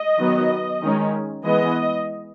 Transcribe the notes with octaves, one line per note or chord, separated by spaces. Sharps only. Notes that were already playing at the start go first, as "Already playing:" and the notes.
Already playing: D#5
D#3 F#3 B3
D#3 G#3 C#4
E3 G#3 B3 D#5